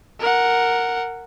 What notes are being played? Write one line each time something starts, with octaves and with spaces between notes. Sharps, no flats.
A#4 F#5